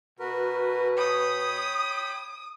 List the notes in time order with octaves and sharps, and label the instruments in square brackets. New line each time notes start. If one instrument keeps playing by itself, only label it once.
[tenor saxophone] B2 [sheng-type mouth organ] F#4 A#4 B4
[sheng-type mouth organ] C#5 G5 B5 [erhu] D#6